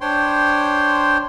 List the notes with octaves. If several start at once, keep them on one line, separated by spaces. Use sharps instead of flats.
D4 C5 C#5 G5 C6